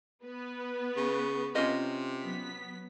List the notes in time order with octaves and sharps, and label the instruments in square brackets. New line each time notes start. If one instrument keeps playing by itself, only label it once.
[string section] B3 B4
[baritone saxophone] C#3
[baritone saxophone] C3 [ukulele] C#4 F4 D#5
[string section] F#3 B3 B6